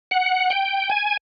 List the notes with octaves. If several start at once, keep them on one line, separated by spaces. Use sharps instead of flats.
F#5
G5
G#5